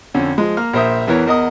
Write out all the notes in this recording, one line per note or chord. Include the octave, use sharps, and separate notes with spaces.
F2 D3 C#4
F3 G#3
A#3 F6
A#1 A#4 C5 E5 D#6
E2 E3 A#4 C#5
E2 A#4 D#5 F#5 D#6